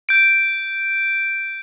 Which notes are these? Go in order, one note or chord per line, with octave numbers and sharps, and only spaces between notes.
G6 D7